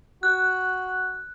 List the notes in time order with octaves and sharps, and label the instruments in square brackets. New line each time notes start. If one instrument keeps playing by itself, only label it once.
[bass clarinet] F#4 [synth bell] F#6